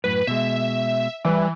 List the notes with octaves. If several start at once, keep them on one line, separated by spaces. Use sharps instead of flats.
F#2 A2 B4
B2 G#3 E5
E3 G3 B4 D5